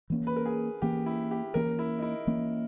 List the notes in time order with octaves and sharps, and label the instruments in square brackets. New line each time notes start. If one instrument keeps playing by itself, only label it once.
[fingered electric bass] E3 A#3 C#4
[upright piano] B4
A#4
G#4
[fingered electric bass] E3 A#3 C#4 [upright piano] G4
[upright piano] E4
G4
[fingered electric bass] E3 A#3 C#4 [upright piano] A#4
[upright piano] E4
D#4
E4
[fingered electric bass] E3 A#3 C#4